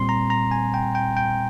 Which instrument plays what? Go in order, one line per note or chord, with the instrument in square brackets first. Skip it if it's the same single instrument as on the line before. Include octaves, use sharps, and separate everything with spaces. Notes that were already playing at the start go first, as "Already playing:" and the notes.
Already playing: [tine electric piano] A#2 G3 C4 C6
A#5
A#5
G#5
G5
G5
G5